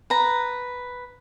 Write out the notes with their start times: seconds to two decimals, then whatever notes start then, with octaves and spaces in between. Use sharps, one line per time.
0.10 B4 A#5